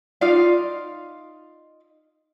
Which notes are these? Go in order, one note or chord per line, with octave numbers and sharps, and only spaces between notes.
D#4 F4 D5 F5